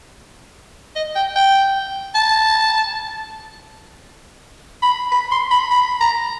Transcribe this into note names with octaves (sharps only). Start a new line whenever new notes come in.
D#5
G5
G5
A5
B5
B5
C6
B5
B5
A#5